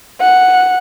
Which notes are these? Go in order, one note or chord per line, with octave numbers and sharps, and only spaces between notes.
F#5